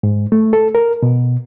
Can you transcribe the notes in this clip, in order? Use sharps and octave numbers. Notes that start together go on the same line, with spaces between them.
G#2
A3
A4
A#4
B2